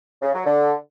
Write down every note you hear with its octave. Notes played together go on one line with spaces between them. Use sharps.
C#3
F#3
D3